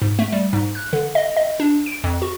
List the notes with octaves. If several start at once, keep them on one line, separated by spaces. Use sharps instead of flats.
G#2
A3
G3
G#2
F#6
D3
D#5
D#5
D4
D7
F2
F#4